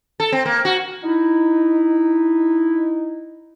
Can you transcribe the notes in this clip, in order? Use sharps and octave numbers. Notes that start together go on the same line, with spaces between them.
A4
C4
A#3
F#4
D#4 E4